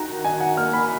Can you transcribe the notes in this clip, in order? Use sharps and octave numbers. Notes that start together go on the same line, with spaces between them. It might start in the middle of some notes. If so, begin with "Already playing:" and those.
Already playing: D#3 F#4 A#5
D#4 G#5
F#5
A#3 F6
B5